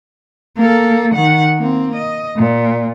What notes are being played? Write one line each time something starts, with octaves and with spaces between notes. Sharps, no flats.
A#3 A4
D#3 F#5
A#3 C4
D#5
A#2